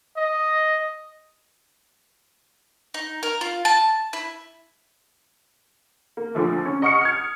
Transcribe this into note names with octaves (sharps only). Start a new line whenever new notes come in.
D#5
D#4
A#4
F4
A5
E4
A#3
A#2 D3 F3 A3
C#4
D#5 F#5 C#6 D#6 F6 C#7
F6 G#6